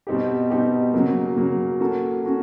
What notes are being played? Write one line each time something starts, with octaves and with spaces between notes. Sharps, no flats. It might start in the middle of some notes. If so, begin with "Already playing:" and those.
B2 G3 C4 D#4 G4
B2 G3 C4 D#4 G4
C#3 F#3 A#3
C#3 F#3 A#3
A#3 C#4 F#4 A4
C#4 F#4 A4